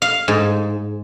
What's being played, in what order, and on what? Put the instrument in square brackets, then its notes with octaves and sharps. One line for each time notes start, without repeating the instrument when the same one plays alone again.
[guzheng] F5
G#2